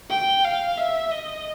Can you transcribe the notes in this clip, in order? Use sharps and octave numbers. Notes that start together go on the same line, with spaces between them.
G5
F5
E5
D#5